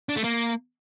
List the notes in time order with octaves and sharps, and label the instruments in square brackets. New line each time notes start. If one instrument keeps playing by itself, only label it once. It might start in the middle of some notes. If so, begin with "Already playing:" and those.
[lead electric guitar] D4
A3
A#3